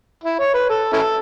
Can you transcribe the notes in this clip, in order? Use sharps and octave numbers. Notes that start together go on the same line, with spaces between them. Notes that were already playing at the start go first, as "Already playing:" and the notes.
E4
C#5
B4
A4
C#4 E4 A4